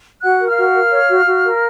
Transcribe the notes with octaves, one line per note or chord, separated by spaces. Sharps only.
F#4 F#5 F#6
A#4
F5 F6
F#4
A#4
C#5
F#4
F#4
A#4